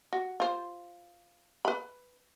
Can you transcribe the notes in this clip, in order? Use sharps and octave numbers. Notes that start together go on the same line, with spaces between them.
F#4
F4 C5
B4 B5